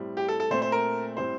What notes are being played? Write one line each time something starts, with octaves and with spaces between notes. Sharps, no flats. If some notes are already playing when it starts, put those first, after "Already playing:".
Already playing: A2 G3 C4
G4
A4
A4
A#2 A3 C4 C5
C5
A#4
A2 G3 C4 C5